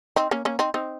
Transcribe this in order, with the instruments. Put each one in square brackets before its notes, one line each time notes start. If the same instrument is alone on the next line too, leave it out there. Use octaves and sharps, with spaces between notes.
[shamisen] C4 D#4
A#3 C#4
A#3 C#4
C4 D#4
C4 D#4